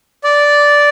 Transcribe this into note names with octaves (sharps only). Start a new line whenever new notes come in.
D5